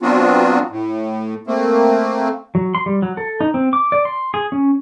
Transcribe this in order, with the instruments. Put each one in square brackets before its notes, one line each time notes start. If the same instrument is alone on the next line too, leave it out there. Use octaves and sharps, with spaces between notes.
[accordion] F#3 B3 C4 D4 F4 F#4
A2
A3 A#3 C4
[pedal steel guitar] F#3
C6
G3
F#3
A4
D#4
C4
D6
D5
C6
G#4
C#4